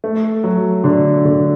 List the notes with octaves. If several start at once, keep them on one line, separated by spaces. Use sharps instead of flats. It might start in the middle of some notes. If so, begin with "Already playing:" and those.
A3
F#3
D3
D3